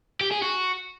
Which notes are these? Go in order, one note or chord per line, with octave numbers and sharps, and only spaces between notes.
G4
G#4
F#4